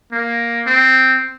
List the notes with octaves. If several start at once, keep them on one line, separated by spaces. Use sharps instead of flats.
A#3
C4